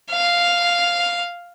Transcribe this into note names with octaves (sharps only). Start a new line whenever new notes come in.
F5